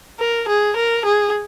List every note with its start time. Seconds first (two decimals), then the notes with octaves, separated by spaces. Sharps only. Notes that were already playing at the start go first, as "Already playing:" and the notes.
0.19 A#4
0.49 G#4
0.77 A#4
1.05 G#4